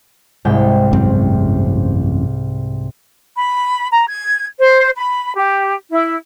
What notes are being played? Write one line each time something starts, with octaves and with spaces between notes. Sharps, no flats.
C2 G#2 G5
A1 F#2 C4
B5
A#5
G#6
C5
B5
G4
E4